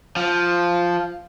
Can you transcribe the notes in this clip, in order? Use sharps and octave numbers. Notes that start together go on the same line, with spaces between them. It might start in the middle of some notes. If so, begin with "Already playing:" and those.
F3